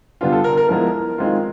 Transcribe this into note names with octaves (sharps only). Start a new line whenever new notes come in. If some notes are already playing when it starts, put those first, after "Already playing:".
D3 G3 B3 D4 F4
A4
A#4
A#4
F3 G#3 B3 E4 A#4
D#3 G#3 C4 F4